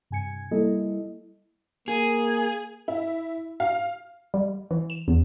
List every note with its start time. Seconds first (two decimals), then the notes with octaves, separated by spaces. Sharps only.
0.11 G2 C3 G#5 G#6 C#7
0.51 G3 A#3 E4 A4 D#5
1.88 A#3 G#4
2.88 E4
3.60 F5
4.34 G3
4.71 E3
4.90 E7
5.08 E2